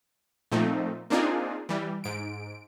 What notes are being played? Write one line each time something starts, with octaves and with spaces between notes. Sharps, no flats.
A#2 F3 A3 C4 D#4
A#3 C4 D4 D#4 F4 G#4
E3 G3
G#2 D7